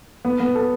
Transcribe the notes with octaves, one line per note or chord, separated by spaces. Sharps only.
B3
B3
A4